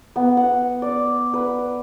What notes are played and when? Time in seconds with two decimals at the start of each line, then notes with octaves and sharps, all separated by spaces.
0.16 B3
0.37 F#5
0.82 D5
1.34 B4